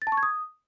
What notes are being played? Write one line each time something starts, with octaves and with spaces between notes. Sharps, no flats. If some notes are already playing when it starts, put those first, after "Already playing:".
A6
A5
C#6
G#6
D#6